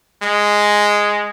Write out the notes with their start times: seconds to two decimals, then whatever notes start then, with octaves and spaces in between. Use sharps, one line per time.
0.23 G#3